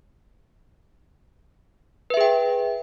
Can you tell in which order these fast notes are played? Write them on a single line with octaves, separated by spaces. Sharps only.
B4 E5 G#4 G5